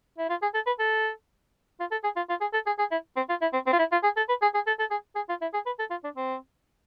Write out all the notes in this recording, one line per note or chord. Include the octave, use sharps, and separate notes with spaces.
E4
F4
G#4
A4
B4
A4
F4
A4
G#4
F4
F4
G#4
A4
G#4
G#4
E4
C4
F4
E4
C4
C4
F4
E4
F4
G#4
A4
B4
G#4
G#4
A4
A4
G#4
G#4
F4
E4
G#4
B4
A4
F4
D4
C4